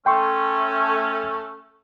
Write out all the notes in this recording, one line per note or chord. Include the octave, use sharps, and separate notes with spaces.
A3 C#4 G5 C6 C#6